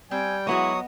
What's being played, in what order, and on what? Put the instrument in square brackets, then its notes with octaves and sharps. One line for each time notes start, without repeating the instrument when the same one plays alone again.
[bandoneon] G3 G5 [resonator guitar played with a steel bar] C4 [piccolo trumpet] G#5
[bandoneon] F#3 D#6 [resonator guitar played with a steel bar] G#3 E4 F#4 [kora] B3 D#5 [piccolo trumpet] C#6